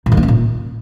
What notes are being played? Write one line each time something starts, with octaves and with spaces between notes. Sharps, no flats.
A#2
D#3
B3
C#4
A#2